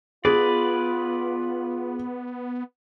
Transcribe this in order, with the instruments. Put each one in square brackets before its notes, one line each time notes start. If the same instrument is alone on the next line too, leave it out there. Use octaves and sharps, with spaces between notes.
[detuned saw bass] B3 [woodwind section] F4 [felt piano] G#4 [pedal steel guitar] B4 D5